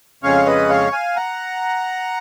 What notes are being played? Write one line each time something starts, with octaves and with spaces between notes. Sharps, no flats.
F2 C#3 G#3 C#4 C#5 F5
B4 D#5
C#5 F5
F5 G#5
F#5 A#5